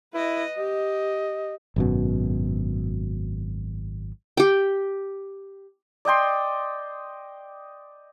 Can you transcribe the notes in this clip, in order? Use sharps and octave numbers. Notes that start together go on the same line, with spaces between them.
E4 B4 D#5
G4 D#5
G#1 F#2 B2
G4 G5
D5 D#5 G5 C6